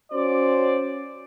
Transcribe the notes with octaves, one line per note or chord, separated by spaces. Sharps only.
C#4 F#4 C5 D5